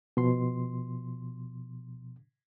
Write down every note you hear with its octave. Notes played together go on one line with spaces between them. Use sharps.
B2 F3 C6